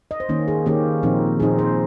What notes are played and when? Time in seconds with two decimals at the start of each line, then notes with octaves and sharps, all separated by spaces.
0.11 D#5
0.20 C5
0.29 D#3 A#3 C#4
0.48 G#4
0.66 D#3 A#3 C#4 G4
1.03 A#2 F3 C4 D#4
1.40 A#2 F3 C4 D#4 G#4
1.58 C5